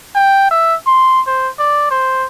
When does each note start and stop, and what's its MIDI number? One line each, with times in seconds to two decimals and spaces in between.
0.15 0.50 79
0.51 0.75 76
0.87 1.21 84
1.27 1.49 72
1.59 1.88 74
1.91 2.27 72